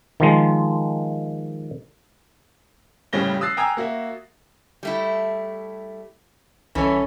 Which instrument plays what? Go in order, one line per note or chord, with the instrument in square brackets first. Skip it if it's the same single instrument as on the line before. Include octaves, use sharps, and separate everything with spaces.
[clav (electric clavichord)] D#3 F3 G#3
[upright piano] F#1 A2 C#3 G3 A#6 G7
D#6 E6 F#6 A6 C7
G5 G#5 A#5 D#6 E6 G#6
A#3 F#4 E5
[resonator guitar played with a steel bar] G3 A3 E4
[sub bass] C2 [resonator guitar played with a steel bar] E3 [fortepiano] C#4 A4 C#5